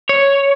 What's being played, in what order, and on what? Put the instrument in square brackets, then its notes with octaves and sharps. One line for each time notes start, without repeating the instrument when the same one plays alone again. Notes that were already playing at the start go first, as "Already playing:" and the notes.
[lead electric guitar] C#5